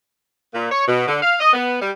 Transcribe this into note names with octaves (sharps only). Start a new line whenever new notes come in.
A#2
C#5
B2
D3
F5
D#5
B3
G3